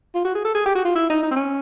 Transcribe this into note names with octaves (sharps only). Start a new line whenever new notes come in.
F4
F#4
G#4
A4
G#4
G4
F#4
F4
E4
D#4
D#4
C4
C#4